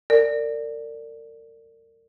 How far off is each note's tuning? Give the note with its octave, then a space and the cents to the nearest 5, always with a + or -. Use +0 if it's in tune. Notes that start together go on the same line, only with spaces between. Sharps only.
A#4 -35 D5 +0